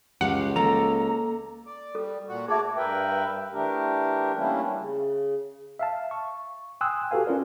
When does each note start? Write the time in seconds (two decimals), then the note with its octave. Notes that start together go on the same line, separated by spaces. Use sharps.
0.21 C#2 G4 F5 F#5
0.56 A#3 A4 A#5
1.66 D5
1.95 G3 A4
2.29 A#2 F#4
2.48 A3 F#4 G#4 D5 E5 A5 D6 G#6
2.76 G2 A#4 B4 E5 G5
3.52 E3 A3 D4 G4 A#4
4.36 G3 A3 A#3 C#4 D4 E4
4.78 C#3
5.79 E5 F5 A5
6.11 C#6
6.81 G5 G#5 C6 D#6 E6 F#6
7.11 F#4 G4 A4 B4 F5 G#5
7.27 C#4 F4 A#4 D5